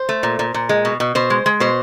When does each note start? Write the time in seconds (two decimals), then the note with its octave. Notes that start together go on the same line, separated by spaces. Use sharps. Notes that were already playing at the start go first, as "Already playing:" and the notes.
Already playing: C5
0.09 A3
0.23 A#2
0.39 A#2
0.54 A#2
0.69 G#3
0.85 B2
1.00 B2
1.15 B2 C5
1.30 G#3
1.46 G#3
1.60 B2 C5